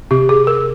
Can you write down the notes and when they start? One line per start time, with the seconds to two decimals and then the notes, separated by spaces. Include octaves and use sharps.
0.11 C3 G4
0.29 G#4
0.47 A#4